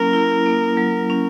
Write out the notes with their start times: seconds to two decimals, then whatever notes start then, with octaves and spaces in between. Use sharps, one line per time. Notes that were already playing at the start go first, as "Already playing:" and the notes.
Already playing: F#3 A#3 C#4 E4 A#4
0.13 E4
0.46 A#3
0.77 F#3
1.10 C#4